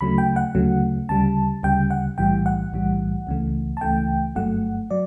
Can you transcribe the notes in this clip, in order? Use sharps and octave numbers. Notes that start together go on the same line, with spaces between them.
D2 C#3 F#3 A3 B5
G5
F#5
D2 C#3 F#3 A3
D2 C#3 G3 A5
D2 C#3 G3 G5
F#5
B1 A2 E3 G3 G5
F#5
B1 A2 E3 G3
C#2 C#3 E3 A3
A5
C#2 C#3 E3 A3 G5
G1 G2 F#3 A3 F#5
F#3 D5